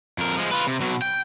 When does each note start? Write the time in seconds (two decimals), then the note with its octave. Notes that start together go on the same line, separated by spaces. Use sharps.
0.18 F2 A#4
0.37 F3 G#3
0.51 F4 B4
0.67 C3
0.81 B2 F#3
1.02 G5